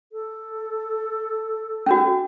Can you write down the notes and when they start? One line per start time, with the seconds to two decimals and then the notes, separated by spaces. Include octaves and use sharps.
0.13 A4
1.86 C#4 D4 F#4